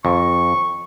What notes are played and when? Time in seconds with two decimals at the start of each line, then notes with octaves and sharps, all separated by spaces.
0.05 F2 C#6